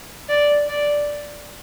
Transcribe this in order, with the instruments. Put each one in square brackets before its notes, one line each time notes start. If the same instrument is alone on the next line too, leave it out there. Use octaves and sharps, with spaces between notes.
[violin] D5
D5